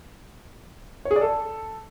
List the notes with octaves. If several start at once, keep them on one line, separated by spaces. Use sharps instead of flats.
C#5
G#4
D5
A4